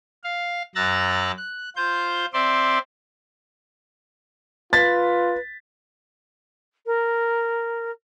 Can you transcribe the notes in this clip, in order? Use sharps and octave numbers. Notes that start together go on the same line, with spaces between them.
F5
F#2 A#5 E6 F#6 A6
F#6
F4 C5 G6
C4 C5 D5 E5 C6
F4 B4 A6 B6
A#4